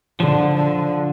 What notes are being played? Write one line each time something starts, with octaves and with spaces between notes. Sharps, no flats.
D3 F3
D3